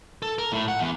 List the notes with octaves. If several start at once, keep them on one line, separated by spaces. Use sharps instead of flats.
A4
A#4
A2
F#5
E2